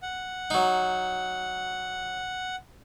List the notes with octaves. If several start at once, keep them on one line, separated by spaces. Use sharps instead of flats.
F#5
F#3 D#4